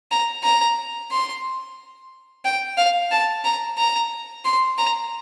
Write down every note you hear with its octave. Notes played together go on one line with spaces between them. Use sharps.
A#5
A#5
C6
G5
F5
A5
A#5
A#5
C6
A#5